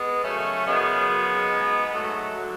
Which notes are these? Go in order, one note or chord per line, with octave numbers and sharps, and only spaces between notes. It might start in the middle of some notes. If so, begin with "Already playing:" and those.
Already playing: G#3 B3
F#2 C#3 A3 C#4
F#2 C#3 G#3 B3
F#2 C#3
G#2
B3
G#2 F#3 A3
D3 F#3